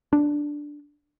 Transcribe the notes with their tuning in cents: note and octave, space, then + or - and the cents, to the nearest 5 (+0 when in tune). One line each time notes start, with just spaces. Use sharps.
D4 +0